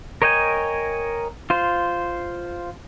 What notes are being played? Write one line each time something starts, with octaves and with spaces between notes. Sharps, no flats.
A#4 C#5 D#5 G5 G#5
F4 C5